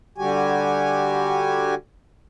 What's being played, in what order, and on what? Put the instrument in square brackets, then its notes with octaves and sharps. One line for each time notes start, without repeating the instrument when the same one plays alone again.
[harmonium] D3 G3 F#4 G4 G#5